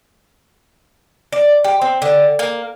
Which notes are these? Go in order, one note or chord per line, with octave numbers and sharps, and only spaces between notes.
D5
G4
C4
D3
A#3